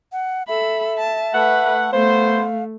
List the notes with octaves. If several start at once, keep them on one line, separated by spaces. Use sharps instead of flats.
F#5
A4 E5 B5
A5
A3 B4 F#5
A3 B3 C5 F5